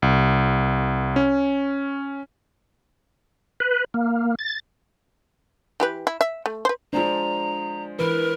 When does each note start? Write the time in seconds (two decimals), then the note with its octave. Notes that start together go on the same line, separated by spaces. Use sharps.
0.02 C2
1.16 C#4
3.60 B4
3.94 A#3
4.39 A6
5.80 E3 G4 B4
6.07 E4
6.21 E5
6.46 A3
6.65 B4 C5
6.93 F3 G#3 D4 C5 A#5
7.99 E3 A#4 B4